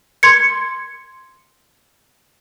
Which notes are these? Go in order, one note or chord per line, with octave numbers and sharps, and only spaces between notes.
C6 G#6 C#7